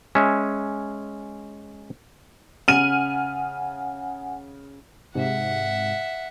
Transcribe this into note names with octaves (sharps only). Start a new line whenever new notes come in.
G#3 C#4 E5
C#3 F#5 G#5 F6 D#7
G#2 C3 E5 F#5